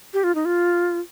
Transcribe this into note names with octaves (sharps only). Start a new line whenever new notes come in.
G4
F4
D#4
F4